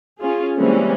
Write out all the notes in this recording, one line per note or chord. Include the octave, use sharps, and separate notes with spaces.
C#4 F4 G#4
E3 G3 G#3 A#3 C4 C#4